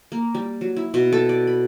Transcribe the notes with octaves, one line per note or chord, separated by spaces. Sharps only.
A#3
G3
F#3
E4
B2
A4
D5
B5